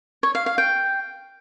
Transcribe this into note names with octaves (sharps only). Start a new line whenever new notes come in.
C#5
F5
F5
G5